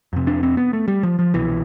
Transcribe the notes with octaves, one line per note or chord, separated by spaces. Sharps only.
F2 C3
D4
C4
B3
A3
G3
F3
F3
C2 B2 E3